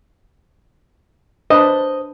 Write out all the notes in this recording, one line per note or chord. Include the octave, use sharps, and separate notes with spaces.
D4 B4 C5 D#5